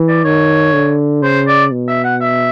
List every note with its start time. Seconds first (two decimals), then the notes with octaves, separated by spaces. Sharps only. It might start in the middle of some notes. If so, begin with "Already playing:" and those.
Already playing: E3
0.08 D5
0.24 D#3 C#5
0.73 D3
1.22 C#3 C5
1.47 D5
1.72 B2
1.88 E5
2.04 F#5
2.21 E5